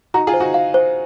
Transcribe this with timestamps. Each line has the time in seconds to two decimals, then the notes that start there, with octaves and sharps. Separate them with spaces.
0.14 D#4 F#4 A#5
0.27 F4 G#4
0.34 C5
0.40 D#4 F#4
0.54 F5
0.74 C5